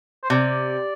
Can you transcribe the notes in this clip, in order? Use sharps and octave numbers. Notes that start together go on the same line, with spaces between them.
C5
C3 D5